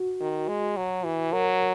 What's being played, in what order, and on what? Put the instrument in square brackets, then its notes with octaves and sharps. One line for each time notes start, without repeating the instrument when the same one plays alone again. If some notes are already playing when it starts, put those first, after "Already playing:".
Already playing: [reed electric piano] F#4
[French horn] D#3
G#3
F#3
E3
[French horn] F#3 [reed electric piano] A#4